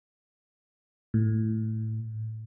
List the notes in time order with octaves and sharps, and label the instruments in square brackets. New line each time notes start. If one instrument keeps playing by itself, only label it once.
[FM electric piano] A2